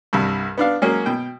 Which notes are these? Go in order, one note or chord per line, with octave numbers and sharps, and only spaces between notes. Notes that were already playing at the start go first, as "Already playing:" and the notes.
C2 G2
B3 D4 F5
F#3 G#3 A#3 C#4
B2 G5